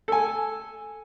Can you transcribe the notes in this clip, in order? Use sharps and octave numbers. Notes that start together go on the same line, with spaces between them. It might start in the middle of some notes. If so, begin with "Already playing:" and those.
A4 G#5